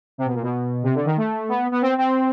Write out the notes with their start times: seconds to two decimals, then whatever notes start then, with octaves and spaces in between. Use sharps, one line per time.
0.18 C3
0.26 B2
0.34 A#2
0.42 B2
0.83 C3
0.95 D3
1.05 D#3
1.17 A3
1.49 B3
1.72 B3
1.82 C4
1.98 C4